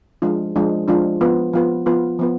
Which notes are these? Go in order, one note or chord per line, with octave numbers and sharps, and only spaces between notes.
F3 G#3 D4 F4
F3 G#3 D4 F4
F3 G#3 D4 F4
F3 B3 F4 B4
F3 B3 F4 B4
F3 B3 F4 B4
F3 B3 F4 B4